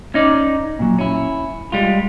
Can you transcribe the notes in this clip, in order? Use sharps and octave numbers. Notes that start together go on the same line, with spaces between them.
C#4 D#4 D5
A#2 F#3
C#4 E4
G3 G#3 F4